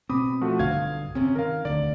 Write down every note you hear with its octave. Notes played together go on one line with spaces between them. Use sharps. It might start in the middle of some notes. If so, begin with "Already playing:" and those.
B2 C4 B5 D6 D#6
F3 A3 F#4
B1 G2 D3 F5 G#6
G1 C3 C4 C#4
D#3 A#4 F5
E1 D2 D3 D5